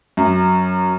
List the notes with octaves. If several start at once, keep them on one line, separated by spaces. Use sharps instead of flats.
F#2